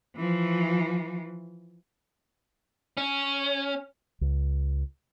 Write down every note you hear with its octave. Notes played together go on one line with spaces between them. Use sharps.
E3 F3
C#4
C#2